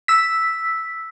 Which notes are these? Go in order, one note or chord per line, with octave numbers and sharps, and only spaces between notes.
E6 B6